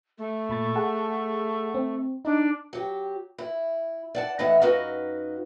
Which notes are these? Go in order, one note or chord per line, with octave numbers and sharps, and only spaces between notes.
A3
A#2 B5 A6
G#4 F#5 A5
C4
D4 D#4
F#3 G4
E4
D5 F#5 A5
A2 E3 D#4 D#5 E5 F#5
F#2 D#4 F#4 B4 D#5 F5